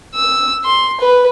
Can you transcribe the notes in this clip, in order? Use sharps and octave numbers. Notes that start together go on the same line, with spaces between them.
E6
C6
B4